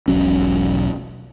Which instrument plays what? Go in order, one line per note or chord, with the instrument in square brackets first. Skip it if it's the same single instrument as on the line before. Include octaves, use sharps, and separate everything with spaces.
[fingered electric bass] E1 B1 F#3 C#4